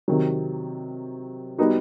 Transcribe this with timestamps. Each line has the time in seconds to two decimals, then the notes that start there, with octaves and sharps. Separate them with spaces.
0.08 C3 D#3 F#3
1.58 G3 B3 D#4 F#4